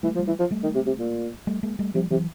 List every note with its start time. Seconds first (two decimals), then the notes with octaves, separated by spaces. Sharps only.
0.03 E3 G3 A3
0.16 F3
0.19 G3 A3
0.28 E3
0.40 F3
0.51 G3 A3
0.63 D#3
0.75 C3
0.87 C3
0.99 A#2
1.47 G3 A3
1.63 G#3 A#3
1.79 G3 A3
1.95 C3 F3 G3
2.11 C3 E3 F#3